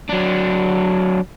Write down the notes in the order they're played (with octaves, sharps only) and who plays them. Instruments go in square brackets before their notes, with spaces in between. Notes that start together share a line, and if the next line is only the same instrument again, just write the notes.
[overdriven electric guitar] F#3 D4